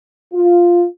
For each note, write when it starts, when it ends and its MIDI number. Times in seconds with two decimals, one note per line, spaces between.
0.33 0.85 65